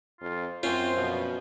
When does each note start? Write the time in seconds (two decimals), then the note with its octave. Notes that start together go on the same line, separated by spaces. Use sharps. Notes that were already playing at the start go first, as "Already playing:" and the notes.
0.21 F2 F4
0.63 F#2 C4 C#4 F4 C5
0.97 B2 F3